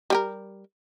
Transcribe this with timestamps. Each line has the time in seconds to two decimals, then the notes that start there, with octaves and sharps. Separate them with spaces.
0.10 G3 G4 A#4